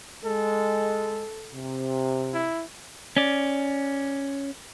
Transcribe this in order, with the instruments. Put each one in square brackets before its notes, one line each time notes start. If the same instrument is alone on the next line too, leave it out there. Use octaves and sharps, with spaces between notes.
[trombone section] G#3 [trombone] A4
[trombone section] C3
[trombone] E4
[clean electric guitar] C#4 D5